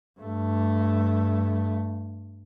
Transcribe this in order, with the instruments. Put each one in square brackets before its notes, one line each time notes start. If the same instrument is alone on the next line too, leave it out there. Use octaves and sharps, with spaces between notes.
[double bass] G2 A3